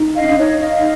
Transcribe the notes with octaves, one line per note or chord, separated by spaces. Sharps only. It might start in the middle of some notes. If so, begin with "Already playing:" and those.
Already playing: D#4
D#5 F5
C#4
D4
D#4 C#5 D#5
D#5 F5